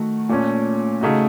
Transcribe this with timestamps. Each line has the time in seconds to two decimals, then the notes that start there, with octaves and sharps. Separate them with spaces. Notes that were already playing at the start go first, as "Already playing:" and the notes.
Already playing: D#3 A3 F#4
0.29 A#2 A3 C#4
1.01 C#3 A3 D#4 F#4